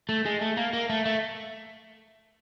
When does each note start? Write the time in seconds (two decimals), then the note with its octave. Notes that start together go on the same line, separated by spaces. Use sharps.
0.09 A3
0.25 G#3
0.41 A3
0.57 A#3
0.73 A#3
0.89 A3
1.05 A3